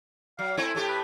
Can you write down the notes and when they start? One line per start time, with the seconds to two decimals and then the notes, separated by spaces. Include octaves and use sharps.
0.39 F#3 F5
0.57 A3 C4 E4 G#5
0.75 A2 A3 G4
0.88 B4